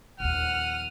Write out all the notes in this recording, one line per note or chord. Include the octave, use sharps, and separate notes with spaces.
A#1 D#2 F#5 F6 D#7